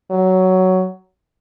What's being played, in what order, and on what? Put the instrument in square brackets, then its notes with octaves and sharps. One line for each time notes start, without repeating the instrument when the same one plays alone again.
[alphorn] F#3